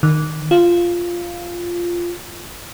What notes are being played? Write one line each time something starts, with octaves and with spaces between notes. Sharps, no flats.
D#3
F4